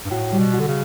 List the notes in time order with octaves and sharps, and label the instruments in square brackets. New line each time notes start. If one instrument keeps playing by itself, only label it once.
[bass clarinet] G2
[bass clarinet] A2 [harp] F#4
[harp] G3
[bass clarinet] B2
[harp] F#4
[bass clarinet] D3
C#3